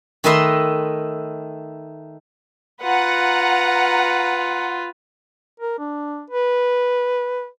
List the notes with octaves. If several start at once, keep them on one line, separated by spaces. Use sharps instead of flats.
D#3 A3 B4 D#5 E5 C6
F4 B4 F#5 A#5
A#4
D4
B4